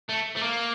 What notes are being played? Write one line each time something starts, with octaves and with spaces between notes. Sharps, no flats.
A3
A3
A#3